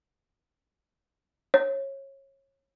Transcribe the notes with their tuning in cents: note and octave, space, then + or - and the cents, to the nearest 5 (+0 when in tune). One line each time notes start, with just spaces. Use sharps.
C#5 -25